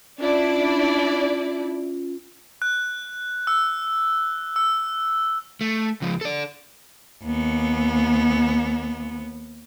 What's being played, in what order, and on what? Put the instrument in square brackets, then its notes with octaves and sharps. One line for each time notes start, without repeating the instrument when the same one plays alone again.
[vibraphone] C#4 F4 [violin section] D4 E4 D5
[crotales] F#6
E6
E6
[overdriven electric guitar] A3
C#2 F3
A4 D5
[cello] D#2 B3